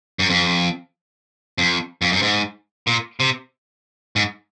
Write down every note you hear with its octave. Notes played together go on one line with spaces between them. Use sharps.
F#2
F2
F2
F2
F#2
G#2
A#2
C3
G#2